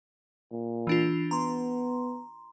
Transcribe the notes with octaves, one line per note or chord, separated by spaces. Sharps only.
A#2
E3 D4 F4
B3 A#5 C6